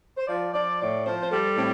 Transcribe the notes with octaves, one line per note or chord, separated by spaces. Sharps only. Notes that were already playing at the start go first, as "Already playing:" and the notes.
C5
F3 D5
F3 D5
A2 D5
F3 C5
C5
G3 A4
A2 C4